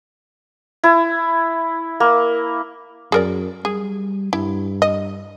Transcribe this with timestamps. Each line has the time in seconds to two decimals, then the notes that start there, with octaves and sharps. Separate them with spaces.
0.84 E4
2.00 A#3
3.12 F#2 G#4 A#4 D5
3.65 G3 G#4
4.33 G2 E4
4.82 D#5